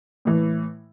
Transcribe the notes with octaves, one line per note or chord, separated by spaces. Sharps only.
A2 E3